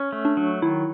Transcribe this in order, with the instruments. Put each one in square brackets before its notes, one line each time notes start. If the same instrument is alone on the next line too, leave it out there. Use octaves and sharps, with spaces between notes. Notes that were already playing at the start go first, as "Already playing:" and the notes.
Already playing: [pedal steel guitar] C#4
A3
[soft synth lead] D4
[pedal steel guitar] F#3
[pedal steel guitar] D#3 [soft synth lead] E4